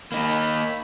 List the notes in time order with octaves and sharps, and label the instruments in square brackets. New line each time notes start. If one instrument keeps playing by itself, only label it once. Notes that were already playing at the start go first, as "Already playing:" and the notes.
[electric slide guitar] A#3 D#4 [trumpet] B5